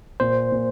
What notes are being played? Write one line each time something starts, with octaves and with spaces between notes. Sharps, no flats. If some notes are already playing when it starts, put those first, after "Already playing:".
A#2 C5
A#2